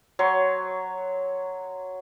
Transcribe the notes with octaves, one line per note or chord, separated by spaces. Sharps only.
F#3 C#5 C6